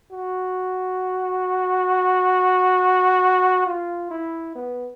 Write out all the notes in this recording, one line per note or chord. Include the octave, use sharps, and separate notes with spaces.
F#4
F4
E4
B3